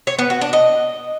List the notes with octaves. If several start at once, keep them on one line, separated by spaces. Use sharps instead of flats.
C#5
B3
F#4
D4
D#5